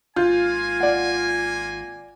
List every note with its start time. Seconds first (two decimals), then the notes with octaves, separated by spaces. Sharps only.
0.16 G#1 A#3 F4 G#5 G6
0.80 D5 F#5